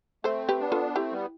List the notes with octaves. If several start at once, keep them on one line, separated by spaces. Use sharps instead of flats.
A3 C4 A4 C5
G4 B4
B3 D4
F4 A4
A3 C4 E4 G4
G3 B3